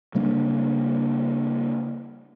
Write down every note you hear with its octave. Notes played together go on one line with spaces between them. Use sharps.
C#3 G3 A#3 D4